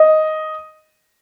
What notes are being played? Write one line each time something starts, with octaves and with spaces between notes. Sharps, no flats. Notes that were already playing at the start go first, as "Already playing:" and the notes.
Already playing: D#5